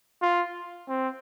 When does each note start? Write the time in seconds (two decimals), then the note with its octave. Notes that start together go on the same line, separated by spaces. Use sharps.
0.22 F4
0.88 C4